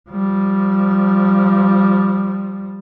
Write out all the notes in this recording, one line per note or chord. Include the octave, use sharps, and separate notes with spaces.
F3 G3